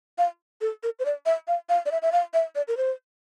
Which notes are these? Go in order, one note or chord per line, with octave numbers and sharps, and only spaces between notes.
F5
A4
A#4
C5
D5
E5
F5
F5
D5
E5
E5
F5
E5
D5
A#4
C5